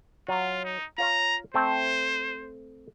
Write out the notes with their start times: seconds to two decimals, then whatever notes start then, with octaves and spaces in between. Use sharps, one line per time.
0.28 F#3 F4
0.65 D#4
0.98 F4 C#5 F5 A#5
1.54 A3 C4 A4 C5